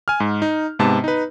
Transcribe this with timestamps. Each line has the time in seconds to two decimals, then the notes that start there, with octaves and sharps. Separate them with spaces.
0.08 G#5 F6
0.20 G#2
0.42 D#4
0.79 G#2 C3 B3 A5
1.04 D#4 B4